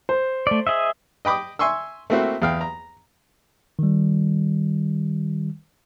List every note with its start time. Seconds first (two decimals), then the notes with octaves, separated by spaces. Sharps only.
0.09 C5
0.47 A3 D5
0.67 G#4 D#5 E5
1.25 D#5 G5 B5 D6 D#6
1.59 E5 G#5 C6 C#6 E6
2.10 A3 A#3 C4 E4 F#4
2.42 E2 F5 G5
2.61 A#5
3.79 D#3 G3